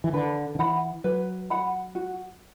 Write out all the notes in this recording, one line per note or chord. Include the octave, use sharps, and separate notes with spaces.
E3
D3 B4
D3
E3 F#5 B5
F#3 B4
F#5 B5
F#4